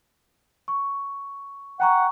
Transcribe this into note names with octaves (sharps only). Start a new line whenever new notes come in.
C#6
F#5 G5 A#5 C#6